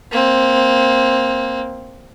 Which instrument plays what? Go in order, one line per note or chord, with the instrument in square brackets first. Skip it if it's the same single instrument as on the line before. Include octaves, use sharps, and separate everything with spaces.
[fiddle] A#3 C4